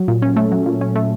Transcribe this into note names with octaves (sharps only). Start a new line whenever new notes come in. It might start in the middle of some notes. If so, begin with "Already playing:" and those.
Already playing: F#3
A#2
C#4
A3
F#3
A#2
C#4
A3